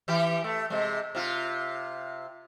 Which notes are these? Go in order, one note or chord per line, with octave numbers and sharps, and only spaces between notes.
E3 G4
A3
C3 G#3
C3 F4